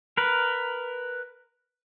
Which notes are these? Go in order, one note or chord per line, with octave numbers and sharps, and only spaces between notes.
A#4 B4